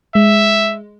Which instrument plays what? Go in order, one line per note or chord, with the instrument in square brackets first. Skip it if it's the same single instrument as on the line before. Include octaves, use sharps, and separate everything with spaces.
[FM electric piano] G#3 [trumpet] E5